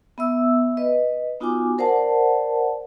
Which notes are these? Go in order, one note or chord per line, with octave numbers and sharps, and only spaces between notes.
B3 E5 E6
B4 D#5
B3 D#4 F4 F#4 G#5 D6
A#4 C5 D5 F#5 A5